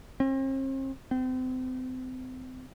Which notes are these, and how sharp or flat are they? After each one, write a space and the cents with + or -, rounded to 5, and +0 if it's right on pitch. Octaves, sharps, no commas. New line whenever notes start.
C4 +45
C4 -35